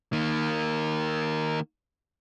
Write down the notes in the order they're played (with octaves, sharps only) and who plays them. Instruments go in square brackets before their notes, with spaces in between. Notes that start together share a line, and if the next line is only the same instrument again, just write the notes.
[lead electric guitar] D#3 A#3